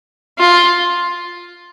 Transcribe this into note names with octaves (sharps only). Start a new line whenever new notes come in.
F4